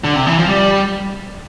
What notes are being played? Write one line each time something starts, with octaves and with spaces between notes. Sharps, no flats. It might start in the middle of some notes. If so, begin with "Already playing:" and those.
D3
C3
E3
F3
G3